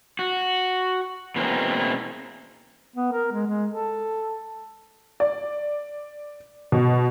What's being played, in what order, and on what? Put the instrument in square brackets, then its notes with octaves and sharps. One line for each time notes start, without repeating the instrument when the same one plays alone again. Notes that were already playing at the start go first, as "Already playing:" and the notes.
[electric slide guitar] F#4
B2 E3 G#3 A#3 C4 C#4
[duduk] B3
A#4
G#3
G#3
A4
[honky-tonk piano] D5
B2